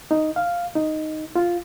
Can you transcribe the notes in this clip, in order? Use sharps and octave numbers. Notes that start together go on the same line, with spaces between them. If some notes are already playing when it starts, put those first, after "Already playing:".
D#4
F5
D#4
F4